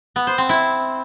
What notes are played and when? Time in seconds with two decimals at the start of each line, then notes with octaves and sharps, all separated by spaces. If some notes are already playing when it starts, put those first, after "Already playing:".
0.16 B3
0.27 C5
0.38 C4
0.49 E4